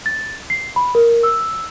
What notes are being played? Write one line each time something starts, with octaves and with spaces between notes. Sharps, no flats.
A6
C7
B5
A#4
E6